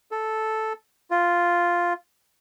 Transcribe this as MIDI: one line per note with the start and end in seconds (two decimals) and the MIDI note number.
0.11 0.73 69
1.11 1.93 65